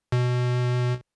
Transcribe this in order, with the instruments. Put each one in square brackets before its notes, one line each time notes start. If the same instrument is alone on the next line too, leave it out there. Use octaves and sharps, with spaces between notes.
[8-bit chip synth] B2